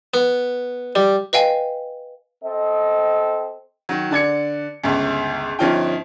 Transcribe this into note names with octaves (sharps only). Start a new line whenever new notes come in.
B3
G3
B4 D#5 F5 G5 G#5
C4 A4 D#5
D#3 F#3
D3 D5 G#6 C#7
G1 C#2
G1 F3 C#4 D#4 F4 G5